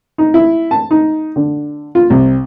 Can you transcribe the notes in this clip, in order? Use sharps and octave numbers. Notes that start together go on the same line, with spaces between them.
D#4
E4
A5
D#4
D3
F4
C2